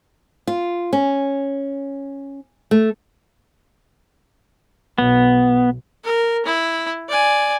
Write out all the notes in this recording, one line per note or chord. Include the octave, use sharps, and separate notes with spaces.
F4
C#4
A3
B1 B3
A#4
E4
D5 G#5